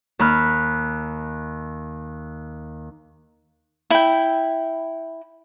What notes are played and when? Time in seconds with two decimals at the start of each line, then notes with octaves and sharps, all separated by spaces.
0.19 D#2 B5 F6 F#6
3.90 E4 G5